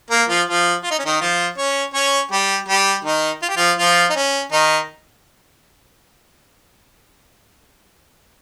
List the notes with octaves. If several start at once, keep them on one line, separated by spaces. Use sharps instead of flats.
A#3 A#4
F3 F4
F3 F4
F4
D#4
C#4
D#3 D#4
F3 F4
C#4 C#5
C#4 C#5
G3 G4
G3 G4
D#3 D#4
F4
G4
F3 F4
F3 F4
D#4
C#4
D#3 D#4